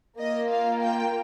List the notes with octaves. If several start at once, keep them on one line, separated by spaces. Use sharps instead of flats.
A#3 F4 D#5
F5
G5